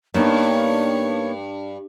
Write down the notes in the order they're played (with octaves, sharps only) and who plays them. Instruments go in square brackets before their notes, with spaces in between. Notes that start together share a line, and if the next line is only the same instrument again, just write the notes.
[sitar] G2 [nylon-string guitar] A#3 B3 D#4 [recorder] C#5